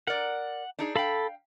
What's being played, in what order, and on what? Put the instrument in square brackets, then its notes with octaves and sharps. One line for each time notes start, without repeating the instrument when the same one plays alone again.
[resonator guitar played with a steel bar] A#4 D5 [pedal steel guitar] F#5
[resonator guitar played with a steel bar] D4 D#4 G#4
[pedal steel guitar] A4 B5 [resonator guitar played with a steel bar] F5 G5